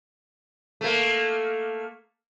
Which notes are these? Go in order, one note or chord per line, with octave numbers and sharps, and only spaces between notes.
A3 A#3